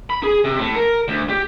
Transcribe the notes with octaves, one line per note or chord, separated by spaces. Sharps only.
B5
G#4
C3
A2
A#4
D2
G4